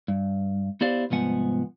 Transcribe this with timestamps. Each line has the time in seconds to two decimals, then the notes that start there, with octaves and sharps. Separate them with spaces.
0.08 G2
0.81 B3 E4 G4 C5 D5 F5
1.10 C2 G#2 F3 B3 F#5 G#5